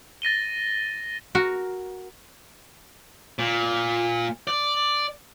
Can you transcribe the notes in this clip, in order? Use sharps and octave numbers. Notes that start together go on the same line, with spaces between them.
A6 A#6 D#7 G7
F#4 A#4
A#2
D5